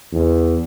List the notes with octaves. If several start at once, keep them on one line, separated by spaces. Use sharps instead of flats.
E2